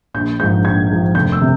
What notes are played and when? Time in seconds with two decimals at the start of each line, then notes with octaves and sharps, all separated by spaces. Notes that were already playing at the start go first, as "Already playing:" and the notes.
0.14 A#1 G6
0.40 G#2 F3 G6
0.64 A#1 G#6
0.90 G#2 F3
1.15 F1 G6
1.32 E6
1.41 C3